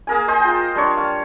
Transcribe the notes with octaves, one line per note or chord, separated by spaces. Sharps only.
A#3 G#4 A#4 G#5
G#4 C5 D#5
F4 G5
G3 D4 C#5
F5